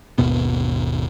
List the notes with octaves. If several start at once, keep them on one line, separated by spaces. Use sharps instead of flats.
G#1 D#2 B2 B3